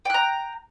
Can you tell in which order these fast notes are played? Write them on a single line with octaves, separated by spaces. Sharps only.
G5 F#6 A#5